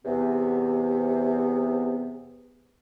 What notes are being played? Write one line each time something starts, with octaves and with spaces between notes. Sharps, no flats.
E2 C3 B3